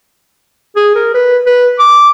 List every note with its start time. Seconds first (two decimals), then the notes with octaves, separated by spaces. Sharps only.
0.76 G#4
0.95 A#4
1.14 B4
1.47 B4
1.79 D6